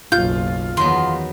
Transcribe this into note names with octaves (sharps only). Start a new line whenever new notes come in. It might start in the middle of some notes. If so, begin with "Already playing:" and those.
F#1 B1 F4 G6
E2 D#3 F#3 B3 C6